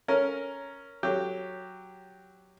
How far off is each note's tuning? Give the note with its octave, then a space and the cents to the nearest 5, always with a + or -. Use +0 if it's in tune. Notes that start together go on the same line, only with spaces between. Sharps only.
C#4 +5 A#4 +0
F#3 +0 G4 +0